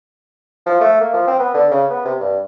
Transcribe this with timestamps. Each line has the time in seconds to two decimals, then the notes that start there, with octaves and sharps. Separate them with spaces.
0.66 F3
0.81 A3
1.01 A#3
1.14 F3
1.28 C4
1.39 B3
1.54 D3
1.71 C#3
1.90 B3
2.05 C3
2.20 G2